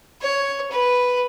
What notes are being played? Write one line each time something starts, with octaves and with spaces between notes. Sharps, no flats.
C#5
B4